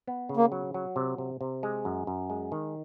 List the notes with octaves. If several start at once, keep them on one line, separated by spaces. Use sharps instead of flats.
B3
C#3
A#3
F#3
F#3
C3
C3
C3
G#3
F#2
F#2
G#3
D#3